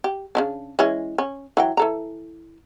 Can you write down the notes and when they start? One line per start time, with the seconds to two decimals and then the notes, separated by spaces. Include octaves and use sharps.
0.04 G4
0.35 C#3 C#4 D4
0.79 E3 G#3 C#4
1.18 C#4
1.57 E3 F#3 G5
1.77 E3 A4 A#5